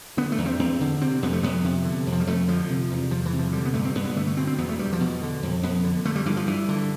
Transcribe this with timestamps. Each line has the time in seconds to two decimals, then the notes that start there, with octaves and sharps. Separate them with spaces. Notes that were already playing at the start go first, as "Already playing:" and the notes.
0.17 D3 B3
0.32 A3
0.38 E2
0.46 C4
0.59 E2 C4
0.80 D3
1.01 C3 C4
1.22 F2 B3
1.33 A3
1.43 F2 B3
1.64 C3
1.85 D3
2.07 F2
2.12 F3
2.20 G3
2.27 F2 A3
2.48 D3 F3
2.69 C3
2.91 E2
3.11 E2 F3
3.26 E3
3.33 C3
3.39 F3
3.53 D3 G3
3.65 B3
3.74 G2 A3
3.85 C4
3.95 G2 B3
4.05 B3
4.16 D3 A3
4.27 A3
4.37 B2 C4
4.47 C4
4.58 E2 B3
4.69 A3
4.79 E2 G3
4.93 F3
5.00 B2
5.22 D3
5.43 F2
5.63 F2 B3
5.84 D3
6.05 D3 A3
6.16 G3
6.26 G2 E3
6.37 F3
6.47 G2 E3
6.69 D3